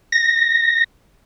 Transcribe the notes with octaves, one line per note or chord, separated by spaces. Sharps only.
A#6